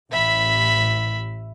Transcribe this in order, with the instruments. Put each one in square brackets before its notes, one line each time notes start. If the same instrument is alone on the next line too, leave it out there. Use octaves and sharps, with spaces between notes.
[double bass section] A1 [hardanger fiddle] E5 B5